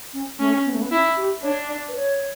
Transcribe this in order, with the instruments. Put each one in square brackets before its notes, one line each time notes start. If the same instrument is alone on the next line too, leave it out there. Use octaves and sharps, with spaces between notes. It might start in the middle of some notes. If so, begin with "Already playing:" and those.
[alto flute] C#4
[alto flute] A3 [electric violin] C#4
[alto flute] B3
A3
B3
[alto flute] C#4 [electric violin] E4
[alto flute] G4
[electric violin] D4 [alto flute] C#5
[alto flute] D5
B4
C#5